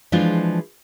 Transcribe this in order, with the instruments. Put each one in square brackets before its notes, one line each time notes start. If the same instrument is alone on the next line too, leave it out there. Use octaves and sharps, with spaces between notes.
[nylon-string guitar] E3 F3 G#3 D4 F4